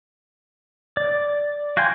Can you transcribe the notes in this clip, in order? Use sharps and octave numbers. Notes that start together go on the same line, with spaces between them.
D5
F#4 F5 G5 G#5 C6